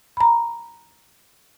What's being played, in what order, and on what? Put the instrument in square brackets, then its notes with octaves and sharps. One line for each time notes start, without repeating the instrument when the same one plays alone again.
[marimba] A#5 B5